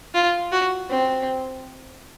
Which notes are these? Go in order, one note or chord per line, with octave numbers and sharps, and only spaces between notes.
F4
F#4
C4